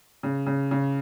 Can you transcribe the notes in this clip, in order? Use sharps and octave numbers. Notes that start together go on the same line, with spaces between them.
C#3
C#3
C#3